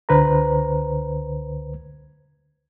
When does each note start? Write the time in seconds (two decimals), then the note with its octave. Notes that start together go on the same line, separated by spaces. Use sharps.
0.09 C#2 D3 B4 C5 A#5